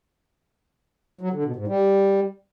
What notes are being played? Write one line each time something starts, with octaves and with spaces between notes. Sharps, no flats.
F#3
D3
B2
G#2
G3